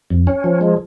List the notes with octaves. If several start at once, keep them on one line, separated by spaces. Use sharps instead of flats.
F2
C#4
F3
G#3